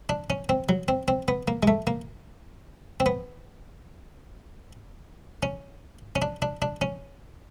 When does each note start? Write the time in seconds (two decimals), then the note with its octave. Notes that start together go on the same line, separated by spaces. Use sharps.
0.09 D4
0.30 C#4
0.49 C4
0.69 F#3
0.88 C4
1.08 C4
1.28 B3
1.48 A#3
1.63 G#3
1.68 A3
1.87 A#3
3.00 C4
3.06 B3
5.43 C#4
6.16 C#4
6.22 D4
6.42 D4
6.62 D4
6.81 C#4